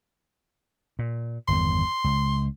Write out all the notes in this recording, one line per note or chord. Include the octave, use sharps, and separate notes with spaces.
A#2
G1 E2 D#3 C6
C#2